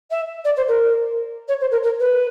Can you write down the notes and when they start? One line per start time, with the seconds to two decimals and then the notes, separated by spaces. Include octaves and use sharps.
0.10 E5
0.44 D5
0.56 C5
0.68 A#4
1.48 C#5
1.60 C5
1.71 A#4
1.83 A#4
1.99 B4